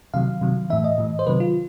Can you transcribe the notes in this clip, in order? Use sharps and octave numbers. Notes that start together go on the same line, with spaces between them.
C3 D#3 F#3 F5
C3 D#3 F#3
A2 E3 E5
D#5
A2 E3
C5
C3 D#3 F#3 B4
F4